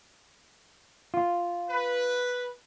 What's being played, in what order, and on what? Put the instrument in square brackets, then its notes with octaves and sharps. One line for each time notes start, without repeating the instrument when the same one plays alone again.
[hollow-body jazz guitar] F4
[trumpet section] B4